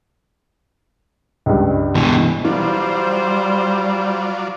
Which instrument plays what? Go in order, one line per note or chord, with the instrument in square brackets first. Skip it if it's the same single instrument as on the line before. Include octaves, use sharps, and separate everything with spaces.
[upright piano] C#2 G2
[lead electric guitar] B2 E3
[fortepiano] E3 [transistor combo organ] F#3 F4 D5 [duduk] G3 [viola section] C5